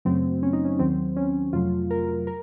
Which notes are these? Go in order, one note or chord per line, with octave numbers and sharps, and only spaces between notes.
F#2 C#3 F#3 A3 C4
C#4
D#4
C#4
D#2 D#3 F#3 C4
C#4
F2 C3 F#3 A3 F4
A#4
A#4